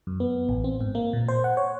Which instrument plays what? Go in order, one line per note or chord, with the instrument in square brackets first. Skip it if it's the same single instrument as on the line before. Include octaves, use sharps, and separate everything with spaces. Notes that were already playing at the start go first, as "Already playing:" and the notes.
[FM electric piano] F#2
B3
A1
C4
G#2
A#3
A#2
C5
F#5
C#5